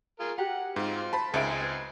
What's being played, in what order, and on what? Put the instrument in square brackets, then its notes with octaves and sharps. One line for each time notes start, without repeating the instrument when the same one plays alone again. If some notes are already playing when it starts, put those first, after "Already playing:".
[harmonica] F4 G#4 A#4
[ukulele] F#4 G4 A#5 [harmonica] F#5
[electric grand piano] G#2 [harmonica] C4 F4
[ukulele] C5 [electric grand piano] A5 B5
[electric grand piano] C#2 D7 [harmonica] G#3 C4 G#4 [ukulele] D#4 A#4 E5
[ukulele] B4